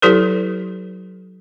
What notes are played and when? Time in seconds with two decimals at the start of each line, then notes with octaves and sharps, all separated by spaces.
0.02 F#3 E4 G4 A4 B4